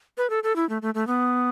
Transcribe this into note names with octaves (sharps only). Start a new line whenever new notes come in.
B4
A4
A4
E4
A3
A3
A3
B3